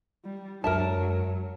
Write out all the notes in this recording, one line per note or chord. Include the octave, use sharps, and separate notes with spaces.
G3
F#2 F#3 G#3 D4 A#4 E5 A5